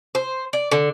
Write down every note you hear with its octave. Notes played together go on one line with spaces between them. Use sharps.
C5
D5
D3